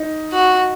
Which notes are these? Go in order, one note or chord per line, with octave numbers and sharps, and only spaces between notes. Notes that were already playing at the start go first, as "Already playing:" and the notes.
Already playing: D#4
F#4